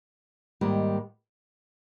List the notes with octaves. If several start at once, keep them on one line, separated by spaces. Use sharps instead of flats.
G#2 D#3 G3 A#3